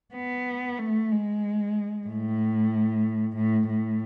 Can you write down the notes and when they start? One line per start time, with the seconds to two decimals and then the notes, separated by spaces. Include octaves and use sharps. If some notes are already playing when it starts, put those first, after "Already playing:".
0.15 B3
0.79 A3
1.12 G#3
2.08 A2
3.37 A2
3.70 A2